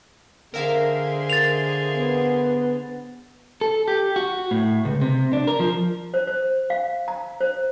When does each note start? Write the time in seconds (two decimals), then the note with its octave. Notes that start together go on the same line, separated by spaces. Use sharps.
0.54 D3 G#4 A#4 C5 E5 F5
1.30 A6 F7
1.96 B3
3.61 A4
3.88 G4
4.16 F#4
4.51 A2
4.85 C#2
5.02 C3
5.33 D4
5.47 A#4
5.60 F3
6.14 C5
6.27 C5
6.70 F5
7.08 A#5
7.41 C5